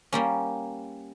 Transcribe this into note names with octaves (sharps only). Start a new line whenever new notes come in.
G3 A#3 C#4